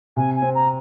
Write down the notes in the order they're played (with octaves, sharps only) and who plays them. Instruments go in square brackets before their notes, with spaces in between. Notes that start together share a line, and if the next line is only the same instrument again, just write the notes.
[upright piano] C3 [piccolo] G#5
[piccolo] G#5
[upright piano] C4
[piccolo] A#5